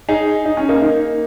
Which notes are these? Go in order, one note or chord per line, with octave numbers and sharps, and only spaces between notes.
D#4 G#4
D#4
C#4
A#3 D#4
A#3 D#4